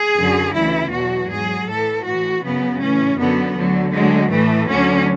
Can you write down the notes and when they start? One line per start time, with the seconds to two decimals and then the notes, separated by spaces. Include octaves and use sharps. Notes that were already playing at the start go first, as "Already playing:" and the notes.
Already playing: G#4
0.17 F#2 D3 F#3
0.55 D2 C#3 E3 E4
0.92 E2 B2 F#3 F#4
1.29 G#2 F#3 G#4
1.67 A2 E3 A4
2.04 A2 E3 F#4
2.42 F#2 C#3 F#3 B3
2.79 A2 E3 C#4
3.17 F#2 D3 F#3 B3
3.55 D2 D3 F#3
3.92 D2 D3 F#3 G#3
4.30 A2 E3 A3
4.67 D2 D3 F#3 C#4